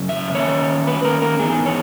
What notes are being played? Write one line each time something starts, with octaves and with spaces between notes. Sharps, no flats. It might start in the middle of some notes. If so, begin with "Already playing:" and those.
Already playing: F#2 C#3
E5
D#3 A#3 C#4 C#5
B4
A#4
A#4
G#2 E3 B3 D#4 G#4
C#5